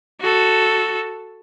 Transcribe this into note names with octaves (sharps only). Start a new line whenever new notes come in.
F#4 A4